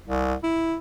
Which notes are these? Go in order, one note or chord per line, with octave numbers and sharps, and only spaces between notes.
C2
E4